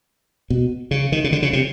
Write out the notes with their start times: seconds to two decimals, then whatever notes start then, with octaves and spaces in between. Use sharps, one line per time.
0.50 B2
0.91 C#3
1.12 D#3
1.24 C#3
1.32 D3
1.42 C#3
1.53 C3